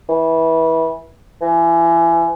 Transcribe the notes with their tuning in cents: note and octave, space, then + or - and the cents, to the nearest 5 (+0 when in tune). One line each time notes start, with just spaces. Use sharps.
E3 -20
E3 +30